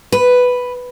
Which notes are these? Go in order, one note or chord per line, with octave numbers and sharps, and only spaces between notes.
B4